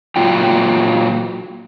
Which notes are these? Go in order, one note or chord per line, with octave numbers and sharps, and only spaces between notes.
A#2 F#3 F4 G5